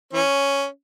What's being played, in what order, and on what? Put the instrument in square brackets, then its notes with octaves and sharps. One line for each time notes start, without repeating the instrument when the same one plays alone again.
[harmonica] E3 C#4